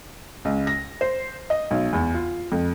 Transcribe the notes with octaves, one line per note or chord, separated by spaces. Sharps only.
C#2
A#6
C5
D#5
B1
E2
F4
F2